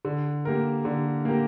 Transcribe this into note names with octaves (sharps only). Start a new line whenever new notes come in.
D3
A#3 G4 A#4
D3
A#3 G4 A#4